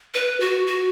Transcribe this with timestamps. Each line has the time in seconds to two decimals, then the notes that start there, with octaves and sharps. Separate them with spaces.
0.14 B4
0.40 F#4
0.67 F#4